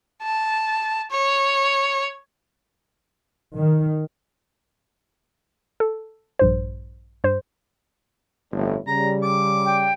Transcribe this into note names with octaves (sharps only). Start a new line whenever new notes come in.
A5
C#5
D#3
A4
A#1 G2 C5
G2 C5
G1 F2 A2
C#3 G3 A#5
D6
G5